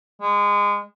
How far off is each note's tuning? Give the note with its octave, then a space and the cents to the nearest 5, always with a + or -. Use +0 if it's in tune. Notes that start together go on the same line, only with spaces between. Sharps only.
G#3 -25